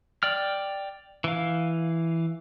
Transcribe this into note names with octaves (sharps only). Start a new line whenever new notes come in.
D5 G5 F6
E3 F5